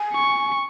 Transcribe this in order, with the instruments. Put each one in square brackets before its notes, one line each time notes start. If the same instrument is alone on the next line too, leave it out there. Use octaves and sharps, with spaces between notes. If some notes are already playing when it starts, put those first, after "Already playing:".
Already playing: [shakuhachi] G#5
[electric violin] C#6